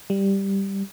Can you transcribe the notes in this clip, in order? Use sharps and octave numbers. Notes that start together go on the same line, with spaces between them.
G3